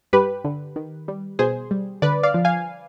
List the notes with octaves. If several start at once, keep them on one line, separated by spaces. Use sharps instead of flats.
G2 G4 B4
D3
D#3
G3
B2 G#4 C5
G3
D3 B4 D5
D5 F5
F3
F5 G#5